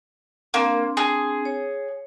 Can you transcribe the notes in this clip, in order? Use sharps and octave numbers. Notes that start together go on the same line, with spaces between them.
A#3 C4 D4
G#4
C#5